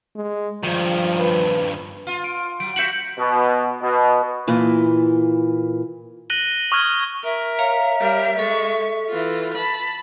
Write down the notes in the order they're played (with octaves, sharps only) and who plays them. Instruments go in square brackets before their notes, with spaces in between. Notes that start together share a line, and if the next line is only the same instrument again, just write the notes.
[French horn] G#3
[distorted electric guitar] G2 D#3 [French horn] F3
[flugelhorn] B4
[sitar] F4
[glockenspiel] D7
[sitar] F#3 [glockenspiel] D7
[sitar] F#4 E5 [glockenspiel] G6 C#7 F#7
[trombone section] B2
B2
[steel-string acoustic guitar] A#2 E3
[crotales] F#6 A#6 D#7 F#7 G7
C#6 D#6 F6 F#6 G#6 G7
[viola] A#4 [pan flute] E5
[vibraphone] C#5 F5 A#5
[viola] G3 A#4
[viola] G#3 C#6 [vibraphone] A4
[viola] E3 F4
A5 B5